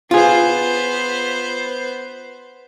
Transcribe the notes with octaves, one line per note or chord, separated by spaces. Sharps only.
B3 F4 G#4 C5